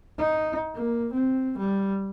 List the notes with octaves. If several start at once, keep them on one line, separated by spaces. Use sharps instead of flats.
D#4
A#3
C4
G3